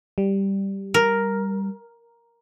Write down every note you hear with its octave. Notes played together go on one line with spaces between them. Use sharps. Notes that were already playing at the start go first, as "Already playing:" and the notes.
G3
A#4